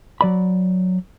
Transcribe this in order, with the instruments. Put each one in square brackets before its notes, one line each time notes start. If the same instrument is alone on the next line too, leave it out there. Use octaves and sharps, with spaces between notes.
[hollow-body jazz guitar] F#3 D5 B5